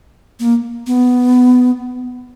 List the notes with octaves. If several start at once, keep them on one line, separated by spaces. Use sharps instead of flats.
A#3
B3